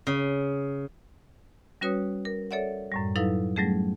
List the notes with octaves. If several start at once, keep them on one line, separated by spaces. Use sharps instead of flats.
C#3
G3 C#4 F#4 B4 C#5 D#6
A#4
A4 C#5 D5 E5 F#5
F#2 A2 G3
F#3 D#4 E4 A4 B4 F5
F#3 G3 A3 C#4 G#4